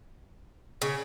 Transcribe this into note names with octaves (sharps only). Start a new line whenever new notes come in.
C#3